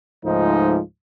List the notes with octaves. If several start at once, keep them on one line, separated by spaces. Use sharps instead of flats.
C#2 G#2 F3 A3 D#4